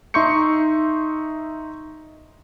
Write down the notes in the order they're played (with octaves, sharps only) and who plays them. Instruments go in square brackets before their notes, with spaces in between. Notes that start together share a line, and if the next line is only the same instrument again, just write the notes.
[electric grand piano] D#4 E5 C6 C#6 G6 C#7